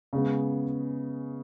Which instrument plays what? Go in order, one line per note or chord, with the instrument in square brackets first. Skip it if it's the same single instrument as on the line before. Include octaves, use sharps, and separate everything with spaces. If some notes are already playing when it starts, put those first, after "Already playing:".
[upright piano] C#3 G#3 B3